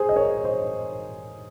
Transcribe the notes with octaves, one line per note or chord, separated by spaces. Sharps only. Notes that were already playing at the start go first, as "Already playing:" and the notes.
Already playing: G#4 C5
D#5
A#4 C#5
C5 D#5